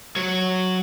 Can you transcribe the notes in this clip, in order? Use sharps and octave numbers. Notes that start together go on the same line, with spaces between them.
F#3 C#5